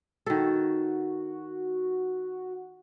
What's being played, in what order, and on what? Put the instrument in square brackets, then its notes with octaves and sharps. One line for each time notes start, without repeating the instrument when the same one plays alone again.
[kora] D#3 A4 [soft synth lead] F#4